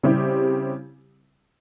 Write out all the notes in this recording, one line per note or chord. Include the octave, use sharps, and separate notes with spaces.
C#3 G3 C4 E4 G4